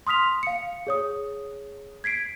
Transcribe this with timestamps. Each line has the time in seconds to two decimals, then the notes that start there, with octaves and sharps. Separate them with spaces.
0.07 C6 D#6 F6 B6 F7
0.43 F5 C#7
0.87 G#4 C#5 D#6
2.04 G#6 B6 C7 D7